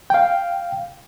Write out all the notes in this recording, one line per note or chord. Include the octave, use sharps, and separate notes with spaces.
F5 G5